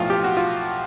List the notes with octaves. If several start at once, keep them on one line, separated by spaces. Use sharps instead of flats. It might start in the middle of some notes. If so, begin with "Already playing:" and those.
Already playing: B1 A2 F3 F4
G4
F#4
F4